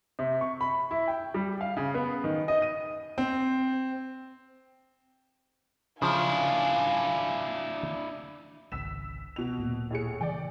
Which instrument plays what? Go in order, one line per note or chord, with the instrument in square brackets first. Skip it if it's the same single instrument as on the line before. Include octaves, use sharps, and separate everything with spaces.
[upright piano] C3
C#6
B5
E4
G5
G3
F5
C#3
B3
D#3
D#5
D#7
[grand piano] C4
[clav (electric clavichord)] C#3 F3 [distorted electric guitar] D4 E4 [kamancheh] F5 G#5
[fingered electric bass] G#1 C#2 [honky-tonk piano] E6 B6 E7
[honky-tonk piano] B2 F7
[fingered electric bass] D1 A#2
[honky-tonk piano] A2 G#4 C#7
[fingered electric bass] C#3 E3 [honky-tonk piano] D5 G5